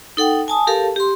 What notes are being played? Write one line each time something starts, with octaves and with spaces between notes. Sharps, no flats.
D#4 A4 F#5 G5
G#5 A5 D#6
G4 A4 A#4 F5 A5
G4 C6